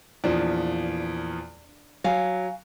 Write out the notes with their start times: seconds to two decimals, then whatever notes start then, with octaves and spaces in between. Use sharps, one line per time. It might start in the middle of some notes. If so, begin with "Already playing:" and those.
0.24 E2 A#2 F3 D4
2.04 F#3 F5 G#5